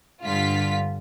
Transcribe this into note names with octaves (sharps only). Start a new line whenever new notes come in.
G2 D3 F4 B6